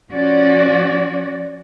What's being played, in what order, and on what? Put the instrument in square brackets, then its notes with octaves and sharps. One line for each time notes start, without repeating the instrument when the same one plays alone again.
[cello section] F3 C#4 F#4 D5